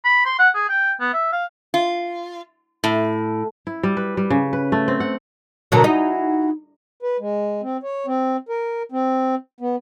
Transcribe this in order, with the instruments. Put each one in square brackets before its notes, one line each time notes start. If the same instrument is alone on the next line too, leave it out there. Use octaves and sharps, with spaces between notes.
[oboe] B5
C6
F#5
G#4
G5
B3
E5
F5
[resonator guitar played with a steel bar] F4
A2
[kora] E4
G3
B4
G3
C#3
B4
A3
C4
F#5
[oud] B2 D3 F#3 [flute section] A#4 A5 A#5
[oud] D#4 [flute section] E4 F#4 G#4
[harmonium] B4
G#3
C4
C#5
C4
A#4
C4
B3